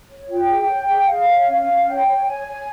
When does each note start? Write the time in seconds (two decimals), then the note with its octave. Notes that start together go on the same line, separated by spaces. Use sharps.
0.09 C#5
0.28 F4 G5
0.48 G#4
0.68 C#5
0.88 G#4
1.07 G#4 F5
1.27 C#5
1.47 C#4 F5
1.67 C#4
1.86 C#5 G5
2.05 C#5
2.25 C#5 G#5
2.45 C#5